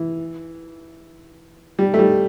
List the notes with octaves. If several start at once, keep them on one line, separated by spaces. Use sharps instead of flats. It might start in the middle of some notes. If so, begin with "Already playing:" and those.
Already playing: E3
G3
A3
G3